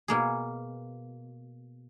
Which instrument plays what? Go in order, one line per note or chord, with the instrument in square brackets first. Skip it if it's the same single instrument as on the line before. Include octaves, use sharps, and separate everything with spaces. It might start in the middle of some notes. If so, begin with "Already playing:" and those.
[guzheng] B2 A#3 G#4